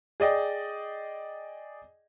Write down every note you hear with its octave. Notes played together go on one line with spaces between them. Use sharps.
G#4 D5 D#5 G5